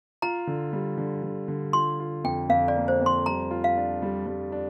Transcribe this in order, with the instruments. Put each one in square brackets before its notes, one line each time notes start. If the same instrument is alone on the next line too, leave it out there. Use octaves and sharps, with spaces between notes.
[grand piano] F4 [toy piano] A#5
[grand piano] D3
G3
D3
D3
D3
[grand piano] F4 [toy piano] C6
[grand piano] F4
[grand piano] F2 [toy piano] G5
[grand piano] F2 [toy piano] F5
[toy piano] D5
[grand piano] A#3
[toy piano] C5
[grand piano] F2
[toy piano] C6
[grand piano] G3 [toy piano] A#5
[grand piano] F4
[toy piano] F5
[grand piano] D4
G3
G3
D4